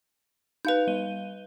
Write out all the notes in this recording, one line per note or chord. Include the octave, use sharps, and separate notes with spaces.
D#4 B4 F5 G6 F7
G3 D#7 G7